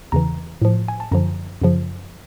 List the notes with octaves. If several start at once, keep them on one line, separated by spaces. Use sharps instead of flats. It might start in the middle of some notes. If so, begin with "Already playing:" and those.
E2 C#3 E3 A#5
A2 F3
G#5
A5
F#2 D3 F3 A#5
F#2 C#3 F3